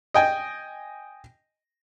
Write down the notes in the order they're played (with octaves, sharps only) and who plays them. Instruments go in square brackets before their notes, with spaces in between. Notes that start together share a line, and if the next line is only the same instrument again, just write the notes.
[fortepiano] D#5 G5 G#5